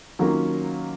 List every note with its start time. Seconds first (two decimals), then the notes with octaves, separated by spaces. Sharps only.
0.19 D#3 F#3 A#3 C#4 F4